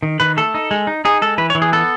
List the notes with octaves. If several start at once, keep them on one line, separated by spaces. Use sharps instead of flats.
D#3
D#3 B4
A3 A4
D#4
G#3
D#4
D#4 G#4
G#3 A4
E3 B4
C#5
E3
G#4
B3 A4